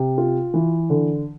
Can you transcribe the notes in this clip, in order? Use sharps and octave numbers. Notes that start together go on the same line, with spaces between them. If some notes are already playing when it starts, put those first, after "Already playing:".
Already playing: C3
F4
E3
D3